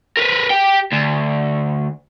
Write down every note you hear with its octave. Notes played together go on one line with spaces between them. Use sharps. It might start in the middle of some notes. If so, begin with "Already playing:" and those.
A#4 B4
G4 G5
D2